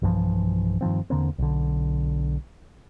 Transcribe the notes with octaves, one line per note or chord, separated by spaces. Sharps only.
B1 G2 E3 F3
G2 D#3 F3 C4
E2 D3 A#3 C4
B1 D3